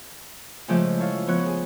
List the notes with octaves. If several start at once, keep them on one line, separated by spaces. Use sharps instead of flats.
C#3 F3 G#3 A3 D5 G6
E4 A4 C#5 F5
F3 B3 C#5 F#6
G#4